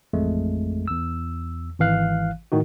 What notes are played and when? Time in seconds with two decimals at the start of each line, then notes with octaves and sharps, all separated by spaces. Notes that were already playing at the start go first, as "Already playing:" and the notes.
0.13 A1 F2 G#3 A3
0.88 E2 E6
1.79 G#1 E3 F5 F#6
2.52 A2 D#3 D#4 F#4